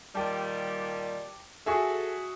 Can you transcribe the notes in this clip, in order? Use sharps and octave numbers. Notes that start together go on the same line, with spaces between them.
A#2 D#3 G3 G4 A5
F#4 G#4 A4 E5